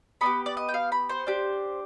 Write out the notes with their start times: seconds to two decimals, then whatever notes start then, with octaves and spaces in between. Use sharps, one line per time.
0.21 B3 D4 B5
0.26 G4
0.46 D5
0.57 D#5
0.69 G5
0.74 F5
0.92 B5
1.09 C5
1.27 D4 G4